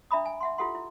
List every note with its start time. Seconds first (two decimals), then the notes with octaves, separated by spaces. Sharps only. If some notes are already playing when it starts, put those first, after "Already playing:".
0.11 D4 E5 A#5 B5 D#6
0.25 G#5
0.41 E5 F#5 C6
0.58 E4 F4 G4 A4 F#5 C6
0.75 E4